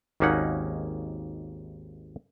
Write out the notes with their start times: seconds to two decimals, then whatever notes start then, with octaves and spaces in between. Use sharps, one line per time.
0.20 G#1 D#2 A#3 C#4 D#4 F#5